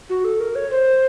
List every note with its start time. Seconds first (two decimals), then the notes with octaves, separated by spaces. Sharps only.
0.10 F#4
0.24 A4
0.40 A#4
0.55 C#5
0.71 C5